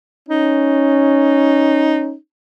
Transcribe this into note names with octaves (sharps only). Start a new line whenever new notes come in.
C#4 D#4